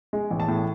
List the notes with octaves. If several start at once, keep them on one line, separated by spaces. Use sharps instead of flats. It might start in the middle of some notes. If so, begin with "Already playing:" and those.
G#3
A1
A5
A2